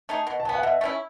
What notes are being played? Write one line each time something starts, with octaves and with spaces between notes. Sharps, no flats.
A3 D#4 G#4
B2
A5
F#3 B3 G#5
F#5
B2 E5
A3
C#4 E4